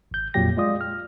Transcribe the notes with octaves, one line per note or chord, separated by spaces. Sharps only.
G#1 G6
F2 A#2 F#3 G4 G5 A#6
G#3 F4 D5 D#6
F6